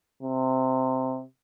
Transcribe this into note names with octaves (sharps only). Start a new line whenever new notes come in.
C3